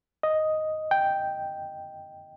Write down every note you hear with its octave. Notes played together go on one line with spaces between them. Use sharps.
D#5
G5